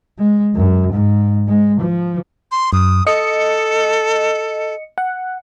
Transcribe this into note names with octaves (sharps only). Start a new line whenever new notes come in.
G#3
F#2
G#2
G#3
F3
C6
F#2 D#6
A4 D#5 C#7
F#5